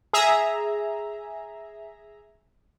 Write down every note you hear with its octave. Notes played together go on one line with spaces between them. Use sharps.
G#4 E5 A#5